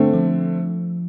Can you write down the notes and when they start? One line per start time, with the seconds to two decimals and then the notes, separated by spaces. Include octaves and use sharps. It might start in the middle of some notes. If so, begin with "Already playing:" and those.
Already playing: D3 A3 C4
0.14 F3